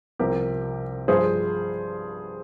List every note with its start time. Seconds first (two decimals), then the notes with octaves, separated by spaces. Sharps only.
0.19 C2 C3 F3 G4 A#4
1.08 G2 F3 G#4 C5